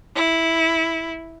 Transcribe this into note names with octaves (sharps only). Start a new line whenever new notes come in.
E4